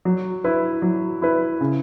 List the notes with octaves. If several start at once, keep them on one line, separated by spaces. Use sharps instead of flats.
F#3
E4 B4
F#3
E4 B4
C#3